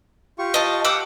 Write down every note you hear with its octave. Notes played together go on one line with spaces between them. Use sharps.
F4 G4 C#6
D#5 A5
G4 F5 F#5 D6 E6